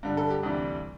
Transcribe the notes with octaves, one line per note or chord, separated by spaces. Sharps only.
G2 D3 G3
A4
G4
D2 C3 E3 G3